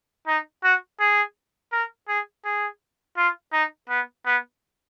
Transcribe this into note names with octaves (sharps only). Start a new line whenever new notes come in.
D#4
F#4
G#4
A#4
G#4
G#4
F4
D#4
B3
B3